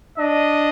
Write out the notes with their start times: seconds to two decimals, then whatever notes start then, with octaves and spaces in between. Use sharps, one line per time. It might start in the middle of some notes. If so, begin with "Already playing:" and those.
0.18 D4 D#5